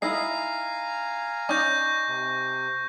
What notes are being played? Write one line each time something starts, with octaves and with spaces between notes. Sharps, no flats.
D#4 E4 D#5 F5 G#5 A#5 C7
C#4 D#4 D5 C#6 G6 A#6
C3